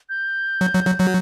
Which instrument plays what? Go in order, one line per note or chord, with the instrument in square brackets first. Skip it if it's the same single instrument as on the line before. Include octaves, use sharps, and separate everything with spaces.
[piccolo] G6
[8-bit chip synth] F#3
F#3
F#3
F#3